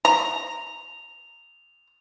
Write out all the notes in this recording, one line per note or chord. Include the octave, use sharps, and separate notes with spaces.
A#5 F7